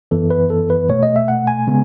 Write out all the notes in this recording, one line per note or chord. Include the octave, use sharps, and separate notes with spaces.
F#2 E3 B3 A4
B4
A4
B4
B2 A3 C#5
D#5
E5
F#5
G#5
C#3 G#3 B3